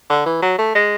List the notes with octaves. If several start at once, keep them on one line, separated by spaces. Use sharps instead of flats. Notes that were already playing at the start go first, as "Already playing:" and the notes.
D3
E3
F#3
A3
G#3